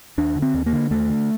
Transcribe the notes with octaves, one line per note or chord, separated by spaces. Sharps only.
D#2 D4
D3
C4
D#2
A#3
D3
D#2 A3
D3